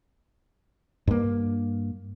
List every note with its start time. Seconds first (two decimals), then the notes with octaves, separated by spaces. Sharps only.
1.07 G2 A#3